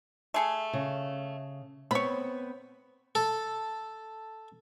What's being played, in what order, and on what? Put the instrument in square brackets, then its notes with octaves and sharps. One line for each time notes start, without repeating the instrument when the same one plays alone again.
[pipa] A3 G#4 A4
[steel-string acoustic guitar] C#3
[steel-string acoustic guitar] B3 C4 [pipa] C#5 B5
[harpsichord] A4